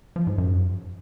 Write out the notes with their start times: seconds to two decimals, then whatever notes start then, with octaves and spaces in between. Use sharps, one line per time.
0.16 F3
0.27 G#2
0.38 F#2